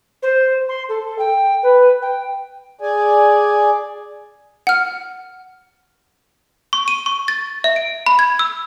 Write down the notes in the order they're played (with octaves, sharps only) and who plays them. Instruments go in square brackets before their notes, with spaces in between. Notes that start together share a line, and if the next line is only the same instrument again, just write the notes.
[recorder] C5
C6
A4
G5
B4
G5
[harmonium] G#4 D5 G#5
[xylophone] F#5 F6
C#6
D#7
C#6
A6
E5
D7
B5
G#6
E6